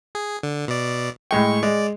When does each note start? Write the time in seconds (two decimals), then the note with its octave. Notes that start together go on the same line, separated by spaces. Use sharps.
0.15 G#4
0.43 D3
0.68 B2 D5
1.31 A2 G#3 G5 C#6
1.63 G#3 D5